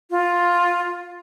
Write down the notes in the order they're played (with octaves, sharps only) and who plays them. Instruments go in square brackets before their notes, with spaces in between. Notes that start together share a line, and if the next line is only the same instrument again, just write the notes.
[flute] F4